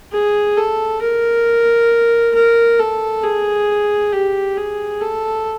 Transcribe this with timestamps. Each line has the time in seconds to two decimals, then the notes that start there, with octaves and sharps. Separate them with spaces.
0.13 G#4
0.58 A4
1.02 A#4
2.35 A#4
2.79 A4
3.24 G#4
4.13 G4
4.57 G#4
5.01 A4